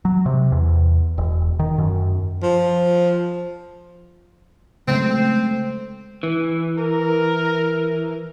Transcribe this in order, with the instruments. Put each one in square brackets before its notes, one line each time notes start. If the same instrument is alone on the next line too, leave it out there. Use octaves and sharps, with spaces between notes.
[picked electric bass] F#3
C3
E2
E1
D#3
F#2
[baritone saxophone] F3
[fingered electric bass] C#3 F#3 G#3 [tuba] A3 [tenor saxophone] C4
[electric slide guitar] E3
[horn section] A#4